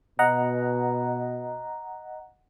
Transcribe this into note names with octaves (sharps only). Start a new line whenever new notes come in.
B2 D#5 F#5 A#5